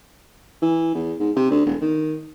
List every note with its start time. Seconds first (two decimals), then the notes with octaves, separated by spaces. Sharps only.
0.62 E3
0.94 E2
1.20 G#2
1.36 C3
1.50 D2
1.66 E1
1.81 D#3